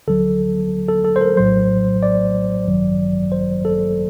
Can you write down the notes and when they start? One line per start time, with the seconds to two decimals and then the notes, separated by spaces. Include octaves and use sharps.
0.07 D2 D3 F#3 A4
0.89 A4
1.05 A4
1.16 C5
1.21 A#4
1.37 A#1 A2 F#3 C5
2.03 D5
2.67 A1 G2 D#3 F#3
3.32 C5
3.65 A4